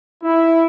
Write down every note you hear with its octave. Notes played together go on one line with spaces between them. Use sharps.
E4